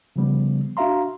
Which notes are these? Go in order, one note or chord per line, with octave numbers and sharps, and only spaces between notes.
C#3 F3 G3 B3
D4 F#4 E5 F5 A#5 C6